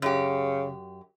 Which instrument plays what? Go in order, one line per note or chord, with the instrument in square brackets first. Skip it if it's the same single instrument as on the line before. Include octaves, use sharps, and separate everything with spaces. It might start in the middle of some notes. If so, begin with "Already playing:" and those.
[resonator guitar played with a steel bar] F#2 G4 [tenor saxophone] C#3